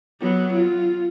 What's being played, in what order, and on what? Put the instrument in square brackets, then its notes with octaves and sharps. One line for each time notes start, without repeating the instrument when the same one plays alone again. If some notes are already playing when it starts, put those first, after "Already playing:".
[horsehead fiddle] F#3 B3
F4